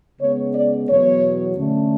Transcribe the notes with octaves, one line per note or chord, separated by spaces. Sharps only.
C#3 G#3 B3 C#5
D5
E2 B2 F#3 B3 C#5
D3 A3 C#4